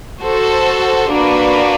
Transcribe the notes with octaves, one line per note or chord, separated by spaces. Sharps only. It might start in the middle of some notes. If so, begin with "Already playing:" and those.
F#4 A4 C5
A#3 D4 F#4 B4